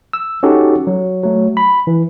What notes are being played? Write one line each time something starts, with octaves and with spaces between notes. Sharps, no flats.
E6
C#4 D#4 F#4 G4 A4
F#3
F#3 A3
B5
E3